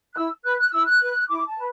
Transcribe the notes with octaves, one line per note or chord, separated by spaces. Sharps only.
F#6
E4 E6
B4 F#6
F#6
E4 E6
F#6
B4
E4 D6
A5
B4